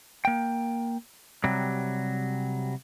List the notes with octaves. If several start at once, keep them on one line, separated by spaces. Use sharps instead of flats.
A#3 G5
C3 F#3 G3